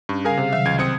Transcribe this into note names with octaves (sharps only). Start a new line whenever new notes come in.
G2 C#4
C#3 G3 G#4 A#4 F5 G#5
C3 G#4 C5
C3 D#3 F#3 E5
C#2 D#5 G#6
C2 C4 D#6 C#7